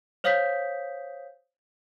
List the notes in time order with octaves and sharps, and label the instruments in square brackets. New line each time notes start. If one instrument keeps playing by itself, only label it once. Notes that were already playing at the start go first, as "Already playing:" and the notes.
[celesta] C5 C#5 F5 D#6 G6 B6